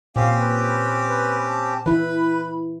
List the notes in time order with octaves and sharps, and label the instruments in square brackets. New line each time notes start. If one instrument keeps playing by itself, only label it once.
[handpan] A#2 [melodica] C4 C#4 G4 [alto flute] F5
[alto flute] B4
B4
A5
[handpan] E3 E4 [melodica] B4 [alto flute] B5